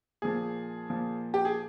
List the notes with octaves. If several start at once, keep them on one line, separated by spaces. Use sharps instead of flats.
A#2 F3 G#4
A#2 F3
G4
G#4